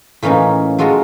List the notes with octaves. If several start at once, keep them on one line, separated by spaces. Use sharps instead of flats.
A2 E3 A#3 C#4 D#4
F#3 G#3 F4 A4 A#4 A#5